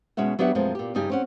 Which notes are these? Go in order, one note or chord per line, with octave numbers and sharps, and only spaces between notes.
B2 G#3 C#4 E5 F#5
F#3 B3 D4 G4 E5 F#5
F#2 B2 F3 G#3 A3 C4
A#2 G4
G2 C#3 D#4 G4 G#5
C4 C#4 F#5